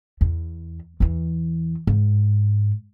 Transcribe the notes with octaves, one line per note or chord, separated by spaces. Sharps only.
E2
E2 E3
G#2